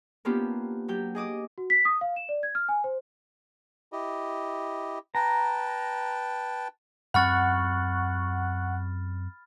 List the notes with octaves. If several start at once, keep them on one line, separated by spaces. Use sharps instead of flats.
A#3 B3 C#4 D4 F4 G4
F#3 G4 G6
G#4 D#5 D6 D#6
F#4
B6
D#6
F5
E7
D5
G#6
F6
G#5
C5
E4 G4 D#5
B4 G5 A5 A#5
F#2 C4 F#5 B5 C#6 F6 F#6 A6